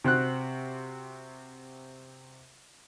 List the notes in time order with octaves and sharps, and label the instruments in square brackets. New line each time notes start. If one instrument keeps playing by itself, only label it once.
[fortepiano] C3 C4 F#4 F#6